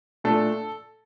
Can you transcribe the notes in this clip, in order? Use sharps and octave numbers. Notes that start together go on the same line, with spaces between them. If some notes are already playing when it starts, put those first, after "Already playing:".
A#2 A3 D4 A4